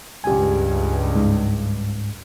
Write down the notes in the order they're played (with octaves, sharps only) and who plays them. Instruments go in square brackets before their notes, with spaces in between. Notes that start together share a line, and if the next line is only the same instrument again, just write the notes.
[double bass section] C#2 G2 [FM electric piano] G4 G#5
[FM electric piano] G#2